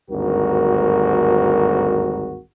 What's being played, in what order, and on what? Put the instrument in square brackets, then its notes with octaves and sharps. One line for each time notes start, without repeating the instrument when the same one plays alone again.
[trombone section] G#1 D2 G2 F#4 A#4